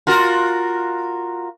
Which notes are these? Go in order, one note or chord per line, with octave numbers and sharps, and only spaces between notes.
F4 F#4 A#4